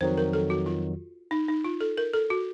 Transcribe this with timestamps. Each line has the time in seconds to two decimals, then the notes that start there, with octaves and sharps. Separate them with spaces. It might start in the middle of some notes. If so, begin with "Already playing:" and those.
0.01 F2 D#3 F#3 C5
0.18 A#4
0.33 A4
0.50 F#4
0.66 F4
1.31 D#4
1.48 D#4
1.64 F4
1.81 A4
1.97 A#4
2.14 A4
2.30 F#4